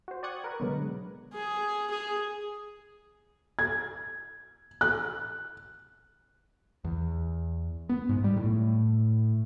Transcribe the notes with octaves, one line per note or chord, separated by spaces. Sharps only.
F#4 C5
D5 G5 C#6 D#6 F#6 G#6
A#4 B4
B2 D3 F#3 G#3 B3
G#4
G#4
G#6
F#6
E2
B3
G#2
G3
A2